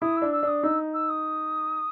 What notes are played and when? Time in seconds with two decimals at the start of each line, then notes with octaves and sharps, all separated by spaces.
0.02 E4 D#6
0.17 E6
0.22 D4
0.32 E6
0.43 D4 D#6
0.63 D#4 E6
0.94 E6
1.09 D#6